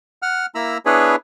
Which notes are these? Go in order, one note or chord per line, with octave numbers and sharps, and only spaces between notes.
F#5 F6
A#3 E4 A#5 B5 E6
B3 D4 E4 G#4 B4 C#5